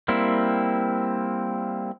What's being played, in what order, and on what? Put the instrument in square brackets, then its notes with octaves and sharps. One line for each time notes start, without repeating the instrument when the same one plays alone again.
[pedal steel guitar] G3 A#3 C4 E4